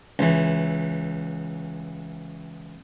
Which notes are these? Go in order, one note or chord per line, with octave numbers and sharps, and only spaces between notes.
C#2 E3